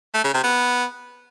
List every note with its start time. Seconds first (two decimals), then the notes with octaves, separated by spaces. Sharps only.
0.14 A3
0.24 C#3
0.34 C3
0.43 B3